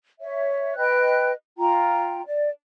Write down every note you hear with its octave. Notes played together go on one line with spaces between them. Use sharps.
C#5 E5
B4 D#5 G5 F#6
F4 G5 A#5
D5